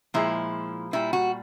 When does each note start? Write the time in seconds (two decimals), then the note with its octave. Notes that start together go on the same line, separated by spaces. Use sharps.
0.14 A#2 F3 G#3 E4
0.93 A#2 G3 E4
1.13 F#4